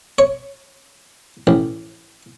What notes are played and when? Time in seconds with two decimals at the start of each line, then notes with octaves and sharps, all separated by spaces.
0.19 C#5
1.47 A1